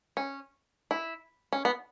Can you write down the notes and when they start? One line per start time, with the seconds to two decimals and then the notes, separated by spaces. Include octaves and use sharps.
0.17 C#4
0.91 E4
1.53 C#4
1.65 B3